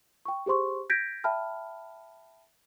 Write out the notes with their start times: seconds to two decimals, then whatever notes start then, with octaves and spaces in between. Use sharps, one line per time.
0.25 G5 C#6
0.46 G4 G#4 C5 C6 C#6
0.90 G6 G#6 A#6 B6 D7
1.24 E5 G5 A5 B5 F6